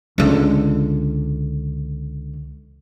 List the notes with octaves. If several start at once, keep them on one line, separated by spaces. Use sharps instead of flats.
C#2 D3